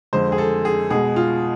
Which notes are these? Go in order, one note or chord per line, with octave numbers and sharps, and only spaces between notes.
F2 D3 G#3 C5
G#4
A4
G#4
B2 G#3 G#4
F4